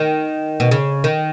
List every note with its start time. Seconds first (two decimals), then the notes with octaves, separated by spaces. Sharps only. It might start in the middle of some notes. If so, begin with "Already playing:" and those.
Already playing: D#3
0.60 B2
0.71 C#3
1.04 D#3